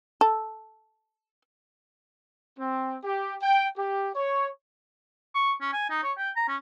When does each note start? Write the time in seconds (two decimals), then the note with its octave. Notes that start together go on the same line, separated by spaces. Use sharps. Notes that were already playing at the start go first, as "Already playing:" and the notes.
0.21 A4
2.59 C4
3.04 G4
3.41 G5
3.76 G4
4.15 C#5
5.35 C#6
5.61 C#4
5.73 G#5
5.90 D#4
6.03 C#5
6.18 G5
6.36 A#5
6.48 C#4